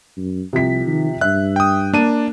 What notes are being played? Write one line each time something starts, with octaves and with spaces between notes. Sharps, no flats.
F#2
C2 C3 F3 B6
D#3
G2 E5 F#6
G5 D#6
A#3 D4 A5 D#7